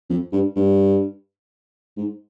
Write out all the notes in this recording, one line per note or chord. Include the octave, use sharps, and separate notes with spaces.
F2
G2
G2
G#2